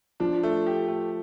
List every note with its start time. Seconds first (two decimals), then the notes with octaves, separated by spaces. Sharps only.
0.20 F3 D4
0.43 A3
0.66 G4
0.88 A3